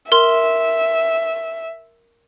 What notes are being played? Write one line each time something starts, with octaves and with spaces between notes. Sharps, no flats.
A#4 E5 C6